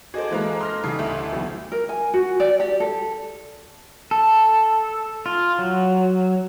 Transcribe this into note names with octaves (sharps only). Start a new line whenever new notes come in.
F#4 G#4 A4 C5 D#5 D6
E3 G#3 A#3 C5 F5 F#6
C6 F6 A#6
A1 C#3 G3 D#4 C7
D2 A3 E4
B1 E3
A#4
G#5
F#4
D5
G4
A4
A4
F4
F#3